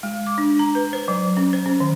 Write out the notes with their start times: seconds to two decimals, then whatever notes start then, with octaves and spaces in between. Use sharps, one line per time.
0.03 G#3
0.26 D6
0.38 D4
0.59 A#5
0.75 B4
0.93 C5
1.08 F#3
1.37 C#4
1.53 C5
1.66 C#4
1.80 D#3